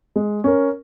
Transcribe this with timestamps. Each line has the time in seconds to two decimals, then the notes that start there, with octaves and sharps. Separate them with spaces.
0.16 G#3
0.44 C#4 A#4